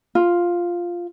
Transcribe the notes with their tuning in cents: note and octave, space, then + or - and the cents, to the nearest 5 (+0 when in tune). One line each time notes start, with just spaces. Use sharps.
F4 +0